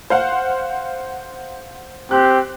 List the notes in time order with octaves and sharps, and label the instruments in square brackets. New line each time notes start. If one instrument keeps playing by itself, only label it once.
[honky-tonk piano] C5 F5 F#5
[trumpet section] C4 G4 [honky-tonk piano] F#6